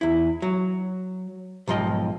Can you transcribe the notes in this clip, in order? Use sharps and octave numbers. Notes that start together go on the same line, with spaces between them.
E2 E4
F#3
B1 G#2 F3 F4 D#5 G5